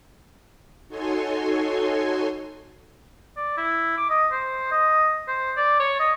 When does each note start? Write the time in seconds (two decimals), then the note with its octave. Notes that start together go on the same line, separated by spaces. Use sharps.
0.88 D#4 F#4 A4 C#5 G#5 C6
3.37 D5
3.58 E4
3.97 D6
4.10 D#5
4.32 C5
4.72 D#5
5.28 C5
5.57 D5
5.80 C#5
6.00 D#5